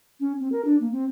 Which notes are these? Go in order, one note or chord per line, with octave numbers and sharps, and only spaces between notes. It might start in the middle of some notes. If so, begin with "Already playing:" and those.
C#4
C4
A#4
D4
A#3
C4